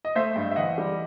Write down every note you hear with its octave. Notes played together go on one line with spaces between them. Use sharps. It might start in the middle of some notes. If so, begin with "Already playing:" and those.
D#5
A3 C5 E5
G2
E5
E3 D#5 F#5
G3